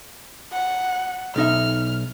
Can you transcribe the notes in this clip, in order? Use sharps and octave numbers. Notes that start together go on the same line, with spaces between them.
F#5
B1 D#4 E5 F6